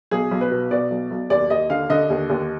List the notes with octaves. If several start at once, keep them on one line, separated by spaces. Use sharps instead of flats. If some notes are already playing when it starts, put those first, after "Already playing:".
B1 G#4
B1
B4
B2
B2 D5
B1
B1
D#2 D5
D#2 D#5
D3 F5
D3 D#5
D#2
D#2